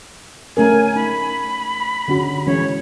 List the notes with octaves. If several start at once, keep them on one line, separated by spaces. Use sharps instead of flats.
A3 C#4 A#4 G#5
D#4 B5
D3 C#4 F#4
E3 G#3 C#4 C#5